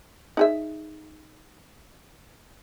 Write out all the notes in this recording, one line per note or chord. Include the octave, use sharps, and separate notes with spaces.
D#4 G#4 E5